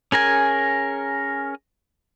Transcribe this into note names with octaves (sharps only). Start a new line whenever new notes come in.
C#4 G#4 A#4 G#5